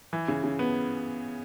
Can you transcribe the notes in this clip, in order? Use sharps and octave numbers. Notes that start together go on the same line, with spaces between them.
E3
C#3
C#3
B3